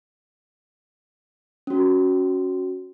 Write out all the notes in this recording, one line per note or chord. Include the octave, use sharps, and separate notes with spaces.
C#4 F#4